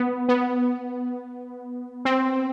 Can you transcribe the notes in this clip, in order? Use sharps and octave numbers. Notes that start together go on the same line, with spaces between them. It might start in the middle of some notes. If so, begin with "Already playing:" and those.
Already playing: B3
B3
C4